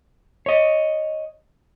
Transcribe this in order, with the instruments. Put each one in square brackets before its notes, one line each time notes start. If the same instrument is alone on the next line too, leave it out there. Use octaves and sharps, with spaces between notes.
[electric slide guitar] C#5 D#5